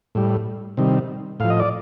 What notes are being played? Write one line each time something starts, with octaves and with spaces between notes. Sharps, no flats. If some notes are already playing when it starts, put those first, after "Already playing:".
A2 G3
C3 D#3 G3
A2 F3 F5
D#5
D5